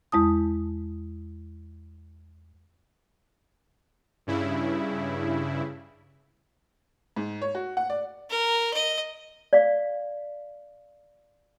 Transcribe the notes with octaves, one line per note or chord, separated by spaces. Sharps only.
E2 G#3 E4 A5 D#6
G2 C#3 E4
G#2
C#5
F#4
F#5
D5
A#4
D#5
D5 F5